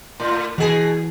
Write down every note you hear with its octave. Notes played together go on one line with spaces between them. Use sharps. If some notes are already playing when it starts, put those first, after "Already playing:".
A2
B2 E3 G#4